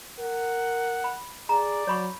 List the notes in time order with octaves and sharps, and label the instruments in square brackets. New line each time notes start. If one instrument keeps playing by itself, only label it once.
[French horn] A#4 [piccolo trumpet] F#5
[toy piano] B5
[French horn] G#4 [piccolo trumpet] D5 [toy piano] A#5
[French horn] F#3 [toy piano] C#5 B5 C#6